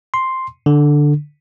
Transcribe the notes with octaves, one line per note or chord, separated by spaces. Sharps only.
C6
D3